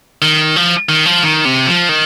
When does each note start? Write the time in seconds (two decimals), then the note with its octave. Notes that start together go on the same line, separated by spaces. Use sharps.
0.22 D#3
0.56 F3
0.89 D#3
1.06 F3
1.23 D#3
1.45 C3
1.67 F3
1.89 D#3